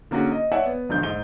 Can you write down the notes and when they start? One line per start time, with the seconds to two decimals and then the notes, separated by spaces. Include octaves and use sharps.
0.11 D3 A#3 C#4 F#4 G#4
0.32 D#5
0.52 C#5 D5 E5 F#5 G#5
0.66 B3
0.89 E1 A#1 D3 G6
1.03 G#2 G7